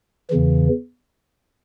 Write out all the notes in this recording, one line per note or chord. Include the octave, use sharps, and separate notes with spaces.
E2 C#3 E3